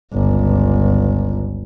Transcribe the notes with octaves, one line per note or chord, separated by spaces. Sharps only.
G1 C#2